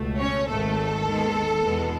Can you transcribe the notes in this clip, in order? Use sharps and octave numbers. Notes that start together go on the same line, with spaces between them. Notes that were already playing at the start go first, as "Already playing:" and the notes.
Already playing: C#2 B2 A3
C#4 C#5
G#1 G#2 D#3 A3 A4
D#2 D#3 G#3 B3
E2 B2 G#3 B3